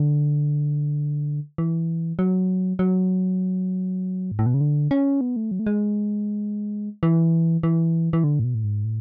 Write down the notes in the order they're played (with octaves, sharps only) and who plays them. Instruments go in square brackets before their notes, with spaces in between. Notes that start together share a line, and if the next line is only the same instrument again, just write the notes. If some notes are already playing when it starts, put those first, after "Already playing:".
Already playing: [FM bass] D3
E3
F#3
F#3
G#2
A2
B2
C#3
D3
C#4
B3
A3
F#3
A3
G#3
E3
E3
E3
D3
A2
B2
A2
G#2
A2